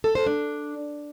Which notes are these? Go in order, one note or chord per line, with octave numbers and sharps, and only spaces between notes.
A4
C5
D4